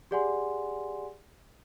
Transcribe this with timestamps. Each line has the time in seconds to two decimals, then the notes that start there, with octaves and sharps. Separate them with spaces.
0.11 G4 G#4 D5 F#5 G#5 C6